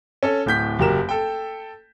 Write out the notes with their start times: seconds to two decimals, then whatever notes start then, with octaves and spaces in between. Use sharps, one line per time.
0.23 C#4 A4
0.46 D1 A2 G6 B6
0.79 F#1 F#3 G4 A#4 E7
1.09 A4 G5